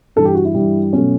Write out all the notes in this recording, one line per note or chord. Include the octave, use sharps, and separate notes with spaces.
G2 E3 G3 A4
G4
F#4
E4
G2 E3 G3
B2 F#3 A3 C#4